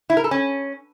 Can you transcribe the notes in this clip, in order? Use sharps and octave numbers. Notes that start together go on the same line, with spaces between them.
E4
A#4
A4
C#4